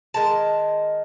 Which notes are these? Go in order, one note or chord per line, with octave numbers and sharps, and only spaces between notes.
D#3 G#3 A5